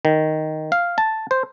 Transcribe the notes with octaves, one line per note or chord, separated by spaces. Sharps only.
D#3
F5
A5
C5